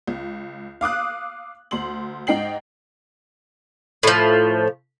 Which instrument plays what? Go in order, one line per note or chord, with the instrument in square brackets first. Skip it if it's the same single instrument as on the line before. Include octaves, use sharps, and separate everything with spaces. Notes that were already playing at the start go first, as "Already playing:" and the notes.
[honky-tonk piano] C#2
F5 D6 D#6 F#6
D2 C6 F#7
G#2 D#4 G5 C7 F#7
[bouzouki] A2 F3